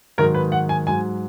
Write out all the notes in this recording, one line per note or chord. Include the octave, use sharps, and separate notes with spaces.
G#2 D#3 F#3 A#4
B4
F#5
G#5
G#2 F#3 G#5